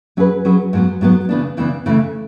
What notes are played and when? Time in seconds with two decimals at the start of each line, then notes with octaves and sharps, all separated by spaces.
0.17 F#3 C#4 G#4 B4
0.45 F#3 C#4 G#4 B4
0.73 G#2 F#3 B3
1.01 G#2 F#3 B3
1.29 C#3 E3 B3 D4
1.57 C#3 E3 B3 D4
1.86 C#3 E3 A3